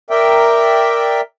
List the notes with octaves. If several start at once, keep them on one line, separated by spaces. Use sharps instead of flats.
A#4 D5 E5 G5